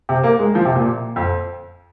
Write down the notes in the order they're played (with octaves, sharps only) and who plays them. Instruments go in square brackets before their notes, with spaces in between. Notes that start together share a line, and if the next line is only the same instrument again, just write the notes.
[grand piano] C3
A#3
G#3
F3
C3
A#2
F2